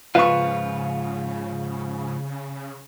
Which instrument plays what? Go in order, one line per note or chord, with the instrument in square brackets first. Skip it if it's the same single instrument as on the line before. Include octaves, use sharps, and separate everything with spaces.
[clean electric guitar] G#2 F3 F4 [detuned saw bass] C#3 [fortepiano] B4 C#6 [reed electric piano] F5